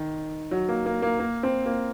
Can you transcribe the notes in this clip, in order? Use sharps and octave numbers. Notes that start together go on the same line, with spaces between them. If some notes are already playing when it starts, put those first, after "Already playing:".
Already playing: D#3
F#3
A#3
A#3
A#3
A#3
C4
A#3